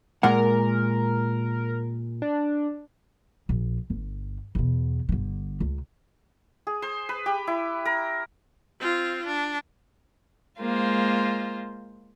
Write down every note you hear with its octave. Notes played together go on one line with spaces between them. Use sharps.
A#2 G#3 A#4 F#5
D4
A#1
G1
E2 B2
G1 D3
C#2
G#4
C5
B4
G4
E4
A#4
C4 F4
D4
G#3 A#3 F4 C5